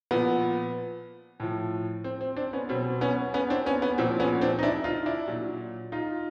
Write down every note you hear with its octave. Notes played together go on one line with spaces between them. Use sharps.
A#2 F3 B3
A2 F3
C4
C4
C4 D4
B3 C#4
B2 F#3 C4
B3 C#4
B3 C#4
C4 D4
B3 C#4
B3
A#2 F3 C4
B3 C#4
C4 D4
D#4
D4 E4
D#4 F4
D4 E4
A#2 F#3
D#4 F4